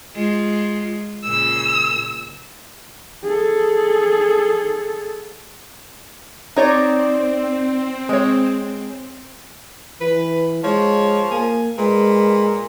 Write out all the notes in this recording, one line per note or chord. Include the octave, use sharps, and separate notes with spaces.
G#3 F4
A#2 C#3 E6
G#4 A4
C4 D#4 C#5 D5
G#3 C#5
E3 B4
F3 G#3 C#5
A#3 G#5
A#2 G#3 B4